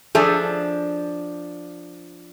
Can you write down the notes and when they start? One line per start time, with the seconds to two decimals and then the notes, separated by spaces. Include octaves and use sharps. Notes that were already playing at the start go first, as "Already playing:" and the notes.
0.15 F3 D4 G#4 A4 C5 E5